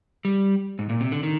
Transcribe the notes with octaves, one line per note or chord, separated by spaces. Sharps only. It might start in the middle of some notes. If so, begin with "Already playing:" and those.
G3
G#2
A#2
C3
D3
D#3